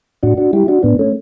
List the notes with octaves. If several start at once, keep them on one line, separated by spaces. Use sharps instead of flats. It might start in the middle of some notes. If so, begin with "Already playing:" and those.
A2 D4 F#4
D4 F#4
G3 E4 G4
D4 F#4
A2 B3 D4
A3 C#4